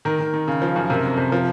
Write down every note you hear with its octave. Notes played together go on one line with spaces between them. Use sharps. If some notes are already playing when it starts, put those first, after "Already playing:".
D#3 A#4
D#3
D#3
C#3
F3
F#2
C3 A#4
F2
C3
F3